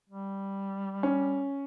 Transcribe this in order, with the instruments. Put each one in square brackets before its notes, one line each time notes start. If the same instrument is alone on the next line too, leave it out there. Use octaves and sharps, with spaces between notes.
[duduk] G3
[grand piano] C#4